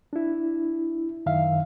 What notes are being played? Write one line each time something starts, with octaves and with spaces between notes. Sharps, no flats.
D4 E4
F#2 D#3 E5 F5